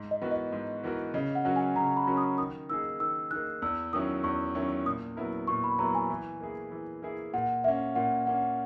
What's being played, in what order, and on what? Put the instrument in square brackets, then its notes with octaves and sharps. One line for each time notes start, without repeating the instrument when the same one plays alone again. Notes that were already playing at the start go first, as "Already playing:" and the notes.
Already playing: [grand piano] G#2
[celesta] D#5
[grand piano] E3 B3 F#4 A#4
[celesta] D#5
[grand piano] G#2
E3 B3 F#4 A#4
[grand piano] C#3 [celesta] D#5
[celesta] F#5
[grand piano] F#3 C#4 F#4 A#4
[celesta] G#5
[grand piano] C#3 [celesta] A#5
[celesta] B5
[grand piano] F#3 C#4 F#4 A#4
[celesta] D#6
[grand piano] D#3 [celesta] D#6
[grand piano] A#3 D#4 G#4 [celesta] E6
[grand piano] D#3 [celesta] E6
[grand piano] A#3 D#4 G#4 [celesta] F#6
[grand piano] E2 [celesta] E6
[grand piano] D#3 F#3 C#4 E4 [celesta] D#6
[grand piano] E2 [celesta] C#6
[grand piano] D#3 F#3 C#4 E4
[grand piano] A#2 [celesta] D#6
[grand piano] F#3 B3 E4 A#4
[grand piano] A#2 [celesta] C#6
[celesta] B5
[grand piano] F#3 B3 E4 A#4 [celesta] A#5
[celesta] G#5
[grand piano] E3
A#3 E4 G#4
E3
A#3 E4 G#4
[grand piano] A#2 [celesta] F#5
[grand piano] A#3 C#4 [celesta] E5
[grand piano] A#2 [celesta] F#5
[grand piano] A#3 C#4 [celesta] F#5